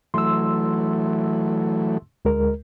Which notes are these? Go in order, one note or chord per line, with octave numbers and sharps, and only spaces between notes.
E3 F#3 A3 C6 E6
D2 G#3 A#4